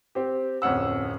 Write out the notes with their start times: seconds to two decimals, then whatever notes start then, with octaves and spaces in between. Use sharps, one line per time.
0.15 C4 G4
0.62 D1 F2 C#4 F#5 E6